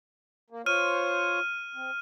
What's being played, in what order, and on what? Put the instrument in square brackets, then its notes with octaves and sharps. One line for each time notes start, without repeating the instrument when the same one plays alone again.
[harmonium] A#3
[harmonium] F4 C5 C#5 [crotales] F6 D#7
[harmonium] C4